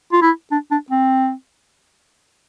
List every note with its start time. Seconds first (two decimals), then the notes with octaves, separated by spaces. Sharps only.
0.13 F4
0.22 E4
0.52 D4
0.71 D4
0.90 C4